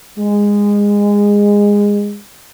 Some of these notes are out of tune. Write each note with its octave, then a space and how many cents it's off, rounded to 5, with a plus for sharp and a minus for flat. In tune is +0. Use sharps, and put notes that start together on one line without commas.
G#3 -20